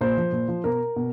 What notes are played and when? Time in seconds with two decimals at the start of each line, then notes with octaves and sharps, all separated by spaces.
0.01 A#2 C5
0.17 F3
0.32 A#2
0.48 F3
0.64 B2 A#4
0.96 B2